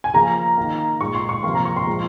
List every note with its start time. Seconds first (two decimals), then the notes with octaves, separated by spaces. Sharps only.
0.04 G#5
0.13 C#3 F3 A#3 A#5
0.58 D#3 A#3
1.01 A#2 G#3 C#6
1.15 C6
1.29 C#6
1.43 C3 F3 A#3 C6
1.55 A#5
1.65 C#6
1.76 C6
1.87 A#2 F3 G#3